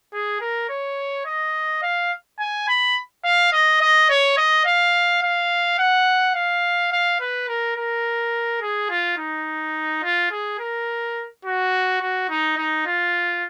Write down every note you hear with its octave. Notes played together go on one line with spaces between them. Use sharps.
G#4
A#4
C#5
D#5
F5
G#5
B5
F5
D#5
D#5
C#5
D#5
F5
F5
F#5
F5
F5
B4
A#4
A#4
G#4
F4
D#4
F4
G#4
A#4
F#4
F#4
D#4
D#4
F4